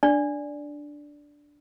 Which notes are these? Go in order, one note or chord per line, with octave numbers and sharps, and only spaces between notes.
D4 D5